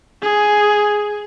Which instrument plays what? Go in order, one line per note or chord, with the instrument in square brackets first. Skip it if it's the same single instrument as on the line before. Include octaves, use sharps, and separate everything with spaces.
[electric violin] G#4